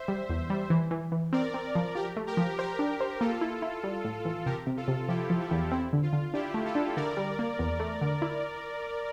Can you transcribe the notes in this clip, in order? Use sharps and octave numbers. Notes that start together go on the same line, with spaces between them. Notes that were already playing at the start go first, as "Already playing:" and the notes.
Already playing: C5 E5
G3
E2
G3
E3
E3
E3
C4 A#4 D5
C4
F3
F3 G4 A#4
A3
G4 A#4
F3
G4 A#4 C5
D4
C5
A#3 F4 A4
E4
E4
G3
A2
E3
C3 G4 A#4
C3
F4 A4
C3
F3 E4 G4
F3
E4
E2
C4 E4
D3
F4
D3
D4 E4 G4
A3
F4 A4
D4
D3 A#4 D5
G3
A#3
E2
A3
D3
E4